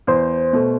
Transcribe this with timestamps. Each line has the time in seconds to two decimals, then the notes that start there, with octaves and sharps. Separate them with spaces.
0.07 E2 C5
0.53 B2 A3